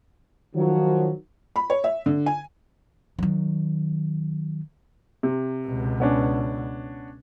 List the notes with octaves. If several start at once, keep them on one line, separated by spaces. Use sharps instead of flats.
D#3 F3 F#3
B5
C#5
E5
D3
G#5
D#3 F#3
C3
C#2 B2
B3 C#4 D4